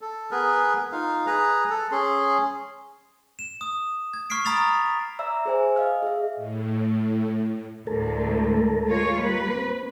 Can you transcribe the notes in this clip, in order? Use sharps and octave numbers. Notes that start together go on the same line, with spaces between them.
A4
B3 G#4 A#4 B4
D#4 F4 F5
G#4 B4 A#5
A4
C#4 G#4 C6
E7
D#6
G#6
C#6 F6 B6 C7 D7
A#5 B5 D#6 A6 B6 F7
D5 E5 A#5 E6
G#4 C5 G#5
D#5 F5 F6
G#4 E5
A2
D2 A2 G#3 A4 A#4
G#3 F4 C#5
G3 A#3 A#4 B4
C4